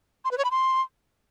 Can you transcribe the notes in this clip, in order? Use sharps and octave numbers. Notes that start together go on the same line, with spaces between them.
C6
B4
C#5
B5
C6